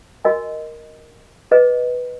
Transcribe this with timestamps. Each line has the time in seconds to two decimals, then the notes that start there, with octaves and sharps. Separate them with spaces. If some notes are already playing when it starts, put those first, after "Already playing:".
0.25 F#4 A#4 D#5 G#5
1.51 G#4 B4 D#5